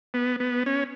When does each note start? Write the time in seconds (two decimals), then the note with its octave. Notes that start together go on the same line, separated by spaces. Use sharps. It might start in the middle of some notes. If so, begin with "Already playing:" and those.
0.14 B3
0.40 B3
0.66 C#4